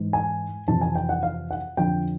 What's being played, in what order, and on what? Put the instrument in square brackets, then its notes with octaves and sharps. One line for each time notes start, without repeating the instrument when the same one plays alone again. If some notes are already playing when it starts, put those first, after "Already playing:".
Already playing: [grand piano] G#2 E3
G#5
F2 C3 E3 A5
G#5
G5
F#5
F5
F#5
F2 D3 F3 G5